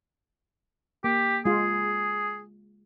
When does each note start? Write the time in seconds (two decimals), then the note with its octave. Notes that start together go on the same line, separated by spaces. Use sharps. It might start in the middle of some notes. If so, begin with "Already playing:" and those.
1.04 A#3 G4
1.45 G#3 F4 G#4